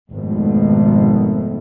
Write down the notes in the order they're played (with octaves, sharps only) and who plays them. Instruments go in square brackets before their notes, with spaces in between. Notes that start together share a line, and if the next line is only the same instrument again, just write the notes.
[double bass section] G#1 F2 B2 D#3 A3